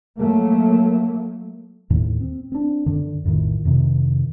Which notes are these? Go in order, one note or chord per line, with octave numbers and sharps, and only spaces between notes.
F#3 A3 A#3
D#2 A2
C4
C4 D4
F#2 D3
A#1 F2 A2 D#3
F2 C3 D#3